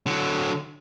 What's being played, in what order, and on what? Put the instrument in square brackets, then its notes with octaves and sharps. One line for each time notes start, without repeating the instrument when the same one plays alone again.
[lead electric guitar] D3 F#3